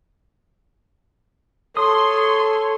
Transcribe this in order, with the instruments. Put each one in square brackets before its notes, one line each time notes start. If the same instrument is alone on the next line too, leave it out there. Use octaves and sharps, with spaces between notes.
[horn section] A4 C#5 [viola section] C6 [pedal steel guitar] D#6